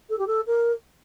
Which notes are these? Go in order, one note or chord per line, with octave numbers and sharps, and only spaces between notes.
A4
G4
A4
A#4